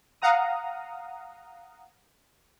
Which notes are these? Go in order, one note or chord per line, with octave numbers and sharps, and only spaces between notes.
F5 F#5 A#5 D#6